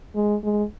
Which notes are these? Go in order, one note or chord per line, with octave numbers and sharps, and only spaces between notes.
G#3
G#3